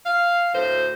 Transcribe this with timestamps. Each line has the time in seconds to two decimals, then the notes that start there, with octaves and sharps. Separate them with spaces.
0.05 F5
0.54 D2 A2 C5